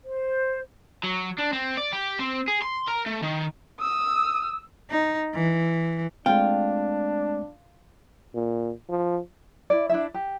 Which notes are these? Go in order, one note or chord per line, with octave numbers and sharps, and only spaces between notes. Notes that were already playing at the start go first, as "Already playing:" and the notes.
C5
F#3
D4
C4
D5
G4
C4
G#4
C6
A#4
A3
D#3
D#6 E6
D#4
E3
G#3 A3 C4 D4 F4 G5
A#2
F3
E4 D5
D4 E4 E5
G4